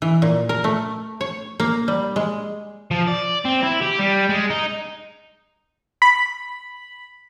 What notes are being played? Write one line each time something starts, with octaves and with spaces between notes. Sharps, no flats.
E3
A#2
A#4
A3
C#5
A#3
G3
G#3
F3
D5
C4
E4
G4
G3
G#3
D#4
B5